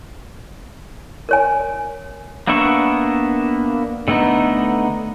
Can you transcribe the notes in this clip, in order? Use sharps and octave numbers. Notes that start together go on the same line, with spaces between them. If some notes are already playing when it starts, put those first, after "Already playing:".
A#4 C#5 G#5
A#3 B3 D4 E5 C#6
D3 A3 B3 D#4